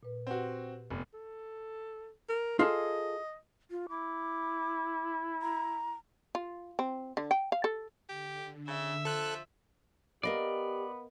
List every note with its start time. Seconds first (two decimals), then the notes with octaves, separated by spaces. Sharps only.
0.03 A#2 B4
0.27 C4 F#4 G4 B4 F#5
0.91 F1 B3
1.14 A4
2.29 A#4
2.59 F4 G#4 A4 D#5
3.71 F4
3.89 E4 D6
5.42 A#5
6.35 F4
6.79 C4
7.17 D3
7.31 G5
7.52 F5
7.64 A4
8.09 D3 G4
8.68 C#3 E5
9.05 F3 A4 F#6
10.23 B3 G4 A#4 D5 D#5 F5